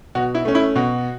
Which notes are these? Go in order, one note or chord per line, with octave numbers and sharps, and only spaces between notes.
B2 F#4
E4
A3 C#4
E4
B2 F#4